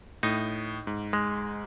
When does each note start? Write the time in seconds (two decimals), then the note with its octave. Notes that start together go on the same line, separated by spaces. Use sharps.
0.23 A2 D#4
0.87 G#2
1.13 G#3